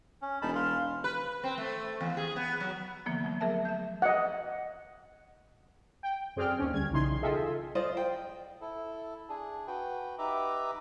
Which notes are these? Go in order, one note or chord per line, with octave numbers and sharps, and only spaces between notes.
C#4
E1 D#4 A5 B5
F5 C6
B4
C4
A3
E2
G#4
B3
F#3
D3 E3 F3 A#3 B3
F3 F#3 A3
G#4 A#4 E5 A5
E5 G6
D#5 F#5
G5
F#2 C4 G#4 D5 G5 F6
D#2 C#4
D2 G3 G#6
B1 C#3 E3 D#4 C6
F4 G#4 A4 D#5 E5 G5
F4 C5 D5 D#5
G5
E4 A4
D4 G#4
F#4 B4 G5
D#4 G4 B4 E5 A#5 D6